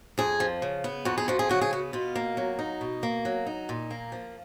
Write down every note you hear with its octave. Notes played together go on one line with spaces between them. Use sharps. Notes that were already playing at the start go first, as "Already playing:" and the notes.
F2 G#4
F3
C#3
B3
F2 F#4
G#4
F3 F#4
G#4
C#3 F#4
G#4
B3 F#4
B2 F4
A#3
F#3
D#4
B2
A#3
F#3
D#4
A#2
A#3
F3